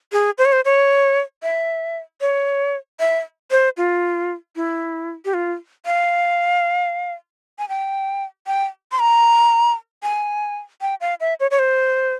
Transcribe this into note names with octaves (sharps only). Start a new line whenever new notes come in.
G#4
C5
C#5
C5
C#5
E5
C#5
E5
C5
F4
E4
G4
F4
F5
G#5
G5
G5
C6
A#5
G#5
G5
F5
E5
C#5
C#5
C5